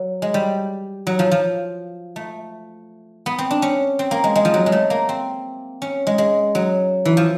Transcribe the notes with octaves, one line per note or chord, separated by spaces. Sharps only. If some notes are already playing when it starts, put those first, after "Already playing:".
Already playing: F#3
G#3
G3
F#3
F3
F3
A3
B3
C4
D4
C#4
C4
A#3
G#3
G#3
F3
F#3
G#3
A3
A#3
C4
C#4
G#3
G#3
F#3
E3
F3